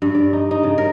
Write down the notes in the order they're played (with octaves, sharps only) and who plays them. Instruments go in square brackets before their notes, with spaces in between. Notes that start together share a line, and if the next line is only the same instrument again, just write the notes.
[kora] G2
D5
D#4
D#4
C#3
A#4